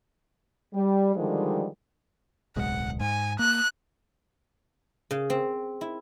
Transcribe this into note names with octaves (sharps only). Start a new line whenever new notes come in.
G3
D3 D#3 F3 G3 G#3
D1 B1 G#3 F#5
G#2 G#5
A#3 F#6
C#3
C4
E4